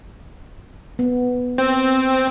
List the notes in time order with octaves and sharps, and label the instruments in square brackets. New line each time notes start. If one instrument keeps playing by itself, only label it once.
[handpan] B3
[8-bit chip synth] C4